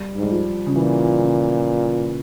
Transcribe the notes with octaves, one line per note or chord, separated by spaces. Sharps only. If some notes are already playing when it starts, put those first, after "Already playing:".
Already playing: G3
G#2
G3
F3
C#3
A#2 E3
C#3